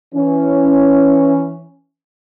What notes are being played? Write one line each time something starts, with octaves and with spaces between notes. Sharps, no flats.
E3 C#4